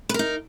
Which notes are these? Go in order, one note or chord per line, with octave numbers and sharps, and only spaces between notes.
D#4 A#4 B4